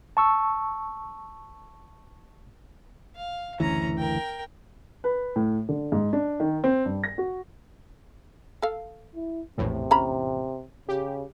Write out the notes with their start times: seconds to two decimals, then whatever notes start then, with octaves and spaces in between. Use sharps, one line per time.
0.17 A5 C#6 E6
3.16 F5
3.60 F#1 D2 E3 C#4 A#5
3.98 A#4 G5
5.04 B4
5.36 A2
5.69 D3
5.92 G#2
6.13 D4
6.40 D#3
6.64 C4
6.85 G2
7.04 A#6
7.18 F#4
8.62 A4 F5
9.15 E4
9.58 A#1 E2 A2 C3
9.91 C#4 A#5 B5
10.89 C#3 G4